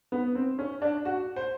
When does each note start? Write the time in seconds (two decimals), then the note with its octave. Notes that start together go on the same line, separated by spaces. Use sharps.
0.12 B3
0.35 C4
0.59 C#4
0.82 D4
1.05 F#4
1.36 C5